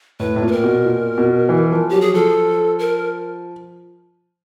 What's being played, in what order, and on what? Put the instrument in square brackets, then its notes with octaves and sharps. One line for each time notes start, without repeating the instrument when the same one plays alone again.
[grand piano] A2 [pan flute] B4
[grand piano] A2
A#2
[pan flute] B4
A#4
[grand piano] B2
A#2
B2
E3
F3
[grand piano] F#3 [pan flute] G4
[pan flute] G#4
[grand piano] F3 [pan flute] A4
[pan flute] A#4